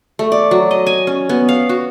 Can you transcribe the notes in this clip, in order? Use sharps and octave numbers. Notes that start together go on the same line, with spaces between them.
A3
D5
F#3
D#5
G#5
C#4
B3
F5
F#4